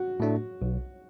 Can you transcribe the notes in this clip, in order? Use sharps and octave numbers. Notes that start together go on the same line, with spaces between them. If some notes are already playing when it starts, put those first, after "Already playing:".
Already playing: F#4
A2 A3 D4
B1